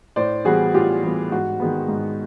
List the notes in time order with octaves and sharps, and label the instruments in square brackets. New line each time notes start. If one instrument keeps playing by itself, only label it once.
[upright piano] A2 C5 D5
E3 G3 B3 F#4 G#4
A2 F4 G4
E3 G3 B3
G#2 F#4
D#3 G#3 B3
G#2